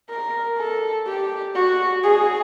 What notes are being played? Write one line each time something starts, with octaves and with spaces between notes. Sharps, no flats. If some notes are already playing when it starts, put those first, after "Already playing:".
A#4
A4
G4
F#4
G#4